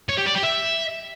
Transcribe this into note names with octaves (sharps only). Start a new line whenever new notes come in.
C#5
G4
D5
G4
E5